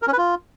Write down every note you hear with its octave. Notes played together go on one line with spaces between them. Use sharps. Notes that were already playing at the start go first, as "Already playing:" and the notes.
A#4
C#4
B4
F4